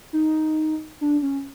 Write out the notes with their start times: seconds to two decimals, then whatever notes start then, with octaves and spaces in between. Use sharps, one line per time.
0.13 D#4
1.01 D4
1.22 C#4